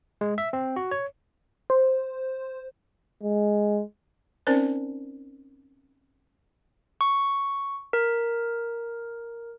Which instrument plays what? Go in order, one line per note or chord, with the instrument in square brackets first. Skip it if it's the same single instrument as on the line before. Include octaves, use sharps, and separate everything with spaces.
[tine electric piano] G#3
E5
C4
F#4
C#5
[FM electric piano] C5
[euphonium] G#3
[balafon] C4 C#4 D#4 A#4 C5 D5
[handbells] C#6
A#4